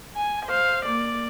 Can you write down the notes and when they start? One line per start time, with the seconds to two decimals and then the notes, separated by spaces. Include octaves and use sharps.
0.16 G#5
0.46 C5 F5
0.86 A#3 D5